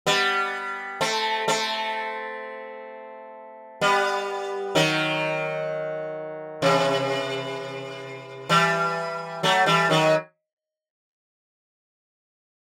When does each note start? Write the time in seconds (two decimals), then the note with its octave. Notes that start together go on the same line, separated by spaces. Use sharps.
0.07 G3 B3
1.01 A3 C4
1.48 A3 C4
3.81 G3 B3
4.75 D#3 F#3
6.62 C3 E3
8.49 E3 G3
9.43 F#3 A3
9.66 E3 G3
9.90 D#3 F#3